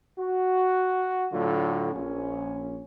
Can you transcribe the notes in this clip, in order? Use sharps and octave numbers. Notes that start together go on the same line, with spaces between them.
F#4
A2 D3 F#3 F4
A#1 C#4